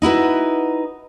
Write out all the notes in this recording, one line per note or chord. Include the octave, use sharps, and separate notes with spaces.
D#4 E4 F#4 B4